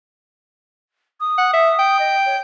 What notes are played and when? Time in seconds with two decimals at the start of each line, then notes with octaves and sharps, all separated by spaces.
1.20 D#6
1.38 F#5
1.53 E5
1.79 G5
1.99 D#5
2.26 C#5